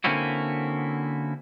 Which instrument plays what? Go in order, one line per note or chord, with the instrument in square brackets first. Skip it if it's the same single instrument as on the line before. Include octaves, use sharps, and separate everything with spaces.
[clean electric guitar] D3 A#3 C4 C#4 E4 F#4